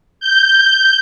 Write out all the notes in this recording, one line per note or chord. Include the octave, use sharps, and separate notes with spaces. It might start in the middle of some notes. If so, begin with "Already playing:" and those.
G6